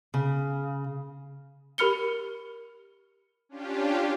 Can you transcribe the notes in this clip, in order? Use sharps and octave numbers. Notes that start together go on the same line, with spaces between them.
C#3
G4 A#4 B5 F6 C#7 G7
C#4 D4 F4 G4